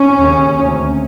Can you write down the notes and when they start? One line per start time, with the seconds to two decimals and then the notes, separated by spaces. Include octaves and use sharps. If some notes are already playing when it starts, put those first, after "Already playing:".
Already playing: C#4
0.19 D#2 C#3
0.57 D2
0.62 C3